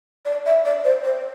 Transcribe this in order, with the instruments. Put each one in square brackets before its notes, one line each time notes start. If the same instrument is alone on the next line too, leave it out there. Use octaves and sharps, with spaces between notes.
[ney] D5
E5
D5
C5
C5